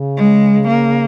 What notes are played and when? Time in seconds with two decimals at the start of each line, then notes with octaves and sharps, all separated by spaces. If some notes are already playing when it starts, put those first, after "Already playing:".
Already playing: C#3
0.17 G#3
0.67 A#3